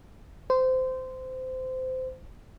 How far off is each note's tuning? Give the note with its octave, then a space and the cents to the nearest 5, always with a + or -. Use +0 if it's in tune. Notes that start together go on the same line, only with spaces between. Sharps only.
C5 -20